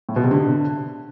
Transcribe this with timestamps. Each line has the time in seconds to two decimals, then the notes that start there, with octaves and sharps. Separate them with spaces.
0.09 A2
0.16 B2
0.24 C3
0.31 D3